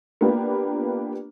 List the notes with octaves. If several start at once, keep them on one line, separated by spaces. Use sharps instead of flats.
A#3 B3 D4 F4 G4 B4